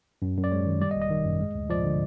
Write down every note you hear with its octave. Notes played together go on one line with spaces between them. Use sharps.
F#2
F#2
D5
G#3 C#5
D#3
G3 D5
D#5
G#1
D#5
D#3
F#2
G#3
D2
F3 D5
D3